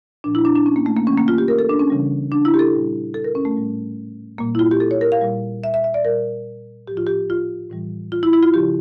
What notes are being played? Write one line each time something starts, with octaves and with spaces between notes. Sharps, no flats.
A#2 F3 D4
E4
D4
D4
C#4
A#3
A3
A#3
C#3 E3 G3 C#4
A#3
F4
G4
A#4
A4
D4
C#4
C#3 E3 G3
D4
E4
G4
A4
A#2 G3
A4
A#4
C#4
A3
A2 G3
A#2 G3 A#3
E4
F4
G4
A4
C#5
A#4
F5
A#2 G3
E5
E5
E5
D5
A#2 G3 A#4
A2 F3 G4
F4
G4
F4
A2 E3 G3
F4
E4
E4
F4
C#3 F3 G4